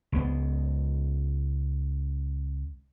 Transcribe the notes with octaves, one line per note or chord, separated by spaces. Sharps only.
C#2 G#3 B3